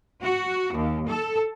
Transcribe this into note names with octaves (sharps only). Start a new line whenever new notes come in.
F#4
D#2
A4